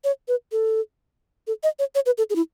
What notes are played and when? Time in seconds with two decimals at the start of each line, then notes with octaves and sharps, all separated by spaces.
0.04 C#5
0.28 B4
0.52 A4
1.47 A4
1.63 D#5
1.79 C#5
1.95 C#5
2.06 B4
2.18 A4
2.30 G#4
2.36 E4